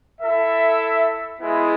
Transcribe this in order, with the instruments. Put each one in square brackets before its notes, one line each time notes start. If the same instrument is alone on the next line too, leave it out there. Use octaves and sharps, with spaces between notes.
[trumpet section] E4 A4 E5
G#3 B3 E4